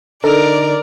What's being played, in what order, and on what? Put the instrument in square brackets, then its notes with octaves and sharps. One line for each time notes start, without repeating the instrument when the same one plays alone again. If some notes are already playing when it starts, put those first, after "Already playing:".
[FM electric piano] D3 D#4 [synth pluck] A4 [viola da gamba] A#4 [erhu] D5